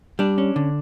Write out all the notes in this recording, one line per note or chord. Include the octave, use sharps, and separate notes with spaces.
G3 D4
C#4
D3